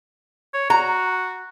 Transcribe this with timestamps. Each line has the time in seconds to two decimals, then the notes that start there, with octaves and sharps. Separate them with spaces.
0.54 C#5
0.70 F#4 A#5